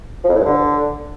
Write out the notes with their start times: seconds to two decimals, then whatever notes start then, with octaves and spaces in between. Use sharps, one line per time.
0.24 F3
0.29 F2
0.35 A2
0.40 G2
0.45 D3